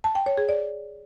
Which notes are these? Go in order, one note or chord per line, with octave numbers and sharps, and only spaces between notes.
A5
G5
C#5
G#4
D5